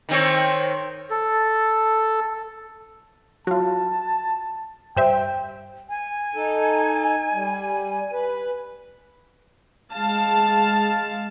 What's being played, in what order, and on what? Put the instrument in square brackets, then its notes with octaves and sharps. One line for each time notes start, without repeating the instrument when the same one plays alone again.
[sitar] D#3 C4 C#5
[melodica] A4
[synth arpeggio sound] F#3 F4 [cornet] A5
[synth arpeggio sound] G2 C5 E5 [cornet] G5
[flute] G#5
[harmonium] D#4 A4
G3
B4
[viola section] G#3 F5 A5